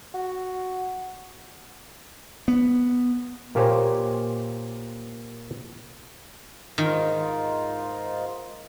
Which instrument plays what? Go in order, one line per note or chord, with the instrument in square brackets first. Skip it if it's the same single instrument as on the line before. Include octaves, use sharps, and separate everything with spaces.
[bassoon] F#4
[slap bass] B3
[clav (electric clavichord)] A#2 A#3 G4 C5 C#5 G#5
[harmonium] G#2 D#4 F4 [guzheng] D#3